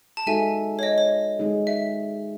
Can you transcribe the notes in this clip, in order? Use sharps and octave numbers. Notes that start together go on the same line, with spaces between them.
A5
G#3 D#4 F#4 A4 E5 G#5
C#5
D#5
C#5
G#3 D#4 G#4
E5